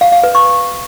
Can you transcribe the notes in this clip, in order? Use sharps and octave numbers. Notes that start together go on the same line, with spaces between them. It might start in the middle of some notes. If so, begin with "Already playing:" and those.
F5
F5
B4
C#6